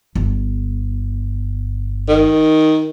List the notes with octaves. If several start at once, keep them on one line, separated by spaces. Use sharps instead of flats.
G1
D#3